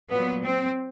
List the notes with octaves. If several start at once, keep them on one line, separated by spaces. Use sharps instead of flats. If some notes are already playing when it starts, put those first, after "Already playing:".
A#2 F#3 B3
C4